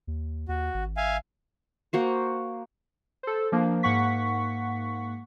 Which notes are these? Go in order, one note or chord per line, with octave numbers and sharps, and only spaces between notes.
D#2
D#2 F#4
G#1
E5 F5 G#5
A#3 F#4 C5
A4 C5
F3 A#3 D4
G#2 A#3 F#5 C#6 B6